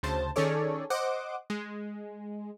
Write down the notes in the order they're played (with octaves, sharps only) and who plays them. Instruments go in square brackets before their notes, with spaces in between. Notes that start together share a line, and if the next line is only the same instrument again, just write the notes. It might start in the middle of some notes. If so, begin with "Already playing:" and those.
[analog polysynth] D2 C#3 C5 A5
D#3 C#4 G#4 A4 C#5 D5
C5 D#5 F#5 D6
G#3